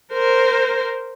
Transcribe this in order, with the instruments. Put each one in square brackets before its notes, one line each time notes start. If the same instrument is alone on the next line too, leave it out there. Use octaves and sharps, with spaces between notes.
[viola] A#4 C5